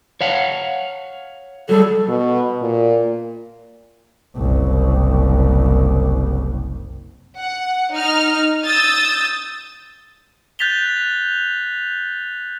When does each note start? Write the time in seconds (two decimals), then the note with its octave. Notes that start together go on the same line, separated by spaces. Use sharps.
0.21 C#5 F5 F#5
1.69 F#3 G3 G#4 A4
2.08 B2
2.62 A#2
4.37 F#1 C2
7.39 F#5
7.92 D#4 F6
8.66 D#6 E6 G6 A6
10.59 F#6 G6 A6 B6 F7 G7